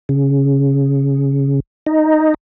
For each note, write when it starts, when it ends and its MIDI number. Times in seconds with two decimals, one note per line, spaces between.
0.09 1.60 49
1.86 2.34 63